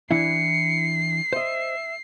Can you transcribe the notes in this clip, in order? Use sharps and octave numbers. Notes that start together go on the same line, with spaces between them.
E3 D4 E4 C7 C#7
C5 D#5 E5